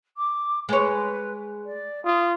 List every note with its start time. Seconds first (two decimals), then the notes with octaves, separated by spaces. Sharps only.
0.17 D6
0.69 G#3 B4 C#5
1.65 D5
2.05 F4 D#6